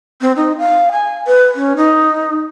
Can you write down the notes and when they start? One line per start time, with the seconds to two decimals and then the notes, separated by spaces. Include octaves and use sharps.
0.21 C4
0.36 D#4
0.58 F5
0.92 G#5
1.27 B4
1.55 C#4
1.76 D#4